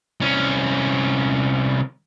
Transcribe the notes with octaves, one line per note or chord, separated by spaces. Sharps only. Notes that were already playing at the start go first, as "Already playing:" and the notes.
C2 C#4